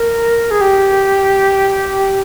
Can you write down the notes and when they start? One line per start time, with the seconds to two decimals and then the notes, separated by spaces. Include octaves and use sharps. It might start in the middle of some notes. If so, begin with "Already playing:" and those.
Already playing: A#4
0.51 G#4
0.61 G4